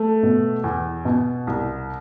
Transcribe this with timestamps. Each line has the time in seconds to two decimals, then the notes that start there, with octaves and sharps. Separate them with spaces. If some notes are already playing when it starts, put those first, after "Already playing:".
Already playing: A3
0.23 B2
0.64 E2
1.05 B2
1.47 C2